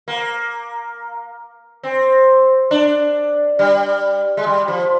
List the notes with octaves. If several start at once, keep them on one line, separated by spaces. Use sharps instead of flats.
A#3
C4
D4
G3
G#3
G3
F3